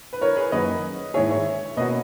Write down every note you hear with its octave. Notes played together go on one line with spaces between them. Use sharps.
B4
A#4 C#5
G#4 B4
F#2 D#3 A#3 C#4 F#4 B4 D#5
G#2 D#3 A#3 E4 G#4 C#5 E5
C#5 E5
B2 A#3 C#4 F#4 B4 D#5